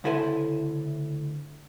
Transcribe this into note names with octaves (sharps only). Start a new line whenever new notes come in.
D2 C#3 E4 A4 C5 G#5